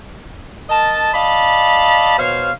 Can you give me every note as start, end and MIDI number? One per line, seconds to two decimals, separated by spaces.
0.70 1.11 70
0.70 1.11 75
0.70 1.11 81
1.14 2.18 74
1.14 2.18 75
1.14 2.18 77
1.14 2.18 81
1.14 2.18 83
2.19 2.51 47
2.19 2.51 72
2.19 2.51 73
2.19 2.51 77